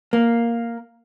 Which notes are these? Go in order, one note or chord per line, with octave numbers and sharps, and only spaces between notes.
A#3